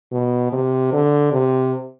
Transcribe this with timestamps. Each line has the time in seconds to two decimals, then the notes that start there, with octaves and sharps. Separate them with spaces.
0.12 B2
0.52 C3
0.93 D3
1.32 C3